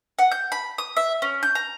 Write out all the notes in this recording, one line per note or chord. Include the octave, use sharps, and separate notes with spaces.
F#5
G6
B5
D#6
E5
C#4
G6
A#5